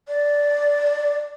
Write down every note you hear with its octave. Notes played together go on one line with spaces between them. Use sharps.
D5